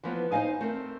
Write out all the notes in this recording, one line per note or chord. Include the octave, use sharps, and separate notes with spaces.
E3 F3 B3
D#4 C5 D#5 F5 G#5
A3 C4 A#4